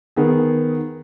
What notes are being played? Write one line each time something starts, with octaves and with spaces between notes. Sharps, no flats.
D#3 B3 G#4